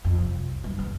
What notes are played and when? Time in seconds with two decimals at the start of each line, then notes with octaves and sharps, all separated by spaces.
0.05 F2
0.21 C2
0.64 G2
0.79 E2